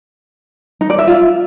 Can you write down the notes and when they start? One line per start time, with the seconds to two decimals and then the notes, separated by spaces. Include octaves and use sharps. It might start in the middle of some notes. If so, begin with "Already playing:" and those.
0.81 D#4
0.90 D5
0.99 E5
1.07 F4